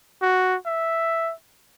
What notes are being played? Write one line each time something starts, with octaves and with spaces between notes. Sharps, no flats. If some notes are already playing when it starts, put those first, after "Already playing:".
F#4
E5